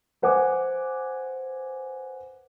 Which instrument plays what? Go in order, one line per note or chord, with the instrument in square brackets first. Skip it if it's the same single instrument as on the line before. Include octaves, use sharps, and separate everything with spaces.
[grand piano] B4 C5 F#5 G#5 D6